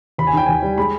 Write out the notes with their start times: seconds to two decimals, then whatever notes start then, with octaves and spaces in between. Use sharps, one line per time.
0.18 D#2 B5
0.27 G#5
0.33 D#3 G5
0.46 D#2 G#5
0.63 G3
0.78 G#3 B5